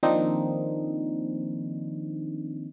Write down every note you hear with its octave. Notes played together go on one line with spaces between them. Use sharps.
D#3 F3 A#3 C4 D4 D#4